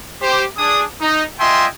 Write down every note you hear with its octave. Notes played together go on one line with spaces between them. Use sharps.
G4 C5
D4 G#4 D#6
D#4
F4 D#5 E5 G5 G#5 C6